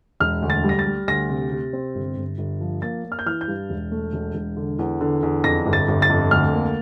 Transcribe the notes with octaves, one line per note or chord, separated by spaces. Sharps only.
E1 F6
D2
A6
G3
A#6
A6
G3
D2 A#6
C3
C3
C4
G1
G1
G1
F3
A#3 A6
A#3
F6
G6
E3 F6
G6
G2
E1
A3
E1
E1
D3
E2
D3
E2
F2 A#6
G1
A6
G1
A6
F2
D2 F6
A#3